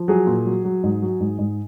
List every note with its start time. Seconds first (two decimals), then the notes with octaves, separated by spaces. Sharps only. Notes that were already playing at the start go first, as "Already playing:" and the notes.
Already playing: F3
0.08 F#3 G#4
0.27 A#2
0.46 F#3
0.64 F#3
0.84 G#2
1.02 F#3
1.20 G#2
1.39 G#2